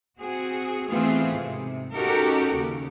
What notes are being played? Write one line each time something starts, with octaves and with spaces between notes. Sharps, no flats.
C4 F#4 G#4
E3 A3 B3 C4 F4 G#4
G#2 C3
C#4 D#4 F#4 G4 A4 A#4
D#2 C#3